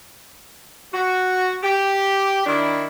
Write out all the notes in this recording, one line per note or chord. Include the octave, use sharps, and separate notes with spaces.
F#4
G4
D#3 D4 E4